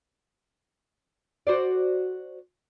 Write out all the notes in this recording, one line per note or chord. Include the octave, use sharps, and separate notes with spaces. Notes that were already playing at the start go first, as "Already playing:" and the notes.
F#4 C5 D5